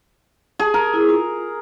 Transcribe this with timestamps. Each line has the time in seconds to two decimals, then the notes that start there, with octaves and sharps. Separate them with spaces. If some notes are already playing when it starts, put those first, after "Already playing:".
0.59 G#4 A5
0.74 A#4
0.94 E4 G#4
1.09 F4